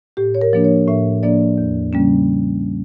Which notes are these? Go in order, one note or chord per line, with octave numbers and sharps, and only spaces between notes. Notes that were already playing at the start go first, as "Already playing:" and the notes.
A2 G4
C#5
A#4
F3 A#3 D4
C#5
A2 E5
F3 A#3 D4 D5
E2
C#3 G3 A#3 C#4